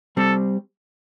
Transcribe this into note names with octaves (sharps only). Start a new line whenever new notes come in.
G3 C4 A4